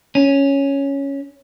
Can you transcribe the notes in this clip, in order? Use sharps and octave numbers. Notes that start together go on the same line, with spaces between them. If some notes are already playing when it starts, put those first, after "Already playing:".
C#4